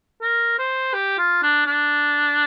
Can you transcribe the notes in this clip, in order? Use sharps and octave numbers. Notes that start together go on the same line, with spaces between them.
A#4
C5
G4
F4
D4
D4